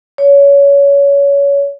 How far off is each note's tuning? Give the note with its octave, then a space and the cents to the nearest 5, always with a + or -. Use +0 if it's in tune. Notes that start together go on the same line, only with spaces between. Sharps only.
C#5 +25